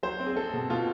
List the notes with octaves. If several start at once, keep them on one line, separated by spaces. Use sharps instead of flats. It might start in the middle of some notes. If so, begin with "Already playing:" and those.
F#3 C5
C4
G#4
C4 A4
B2
B2 F4